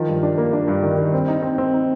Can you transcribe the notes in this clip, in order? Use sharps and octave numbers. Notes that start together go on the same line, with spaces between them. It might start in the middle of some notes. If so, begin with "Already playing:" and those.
Already playing: D#3 F3
G2
D4
A#3
D4
G2
D#3
D#3
C4
D#4
C4
C4
D#4